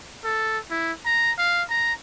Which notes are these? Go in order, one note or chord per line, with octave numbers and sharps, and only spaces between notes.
A4
E4
A#5
F5
A#5